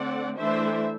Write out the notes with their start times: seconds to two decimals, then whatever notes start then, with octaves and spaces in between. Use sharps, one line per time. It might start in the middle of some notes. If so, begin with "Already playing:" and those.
Already playing: D3 A3 C4 D5 F#5
0.37 E3 A3 D4 C5 E5